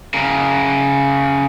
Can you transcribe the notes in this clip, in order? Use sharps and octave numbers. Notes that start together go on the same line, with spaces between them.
C#3 A#4